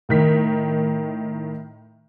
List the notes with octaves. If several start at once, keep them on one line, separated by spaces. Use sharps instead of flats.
A2 D#3 B6